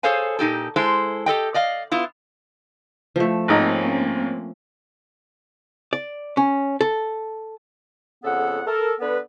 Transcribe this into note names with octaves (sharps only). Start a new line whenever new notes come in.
G#4 A4 C5 C#5 F5 G#5
A#2 D#4 G4 A4
G#3 E4 A4 C5
G4 A4 D#5 G5
D5 D#5 F5
B3 E4 F4
F3 A3
G#1 A#3 C4 C#4 D#4
D5
C#4
A4
F2 C#3 B3 A4 F#5
A4 A#4
D3 B3 B4